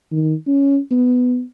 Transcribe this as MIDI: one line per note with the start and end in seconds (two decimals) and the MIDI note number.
0.12 0.34 51
0.47 0.79 61
0.91 1.43 59